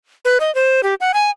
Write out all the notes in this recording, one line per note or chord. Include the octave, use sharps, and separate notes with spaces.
B4
D#5
C5
G4
F#5
G#5